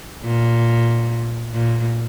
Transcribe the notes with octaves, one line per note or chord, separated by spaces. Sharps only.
A#2
A#2